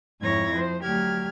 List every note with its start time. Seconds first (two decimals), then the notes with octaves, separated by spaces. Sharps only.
0.20 F2 G#2 E4 C#5 G#6 A#6
0.52 F3 C5
0.82 D2 F#3 G4 F6 G#6